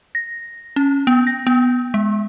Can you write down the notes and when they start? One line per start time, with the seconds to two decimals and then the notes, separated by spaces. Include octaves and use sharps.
0.15 A#6
0.76 C#4
1.07 B3
1.27 A#6
1.47 B3
1.94 G#3